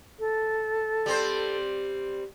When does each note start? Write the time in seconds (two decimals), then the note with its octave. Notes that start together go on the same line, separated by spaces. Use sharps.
0.19 A4
1.06 G3 C4 C5